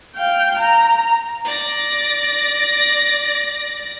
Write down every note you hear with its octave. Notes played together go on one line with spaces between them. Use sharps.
F5 G5
A#5
D5 A#6